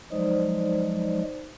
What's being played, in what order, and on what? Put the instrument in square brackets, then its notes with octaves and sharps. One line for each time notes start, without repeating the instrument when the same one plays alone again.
[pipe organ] F3 F#3 G#3 [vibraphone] D#4 C5 D5